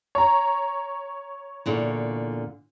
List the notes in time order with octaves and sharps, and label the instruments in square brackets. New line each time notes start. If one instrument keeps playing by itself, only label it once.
[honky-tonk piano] C#5 A#5
[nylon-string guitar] E2 A#2 D3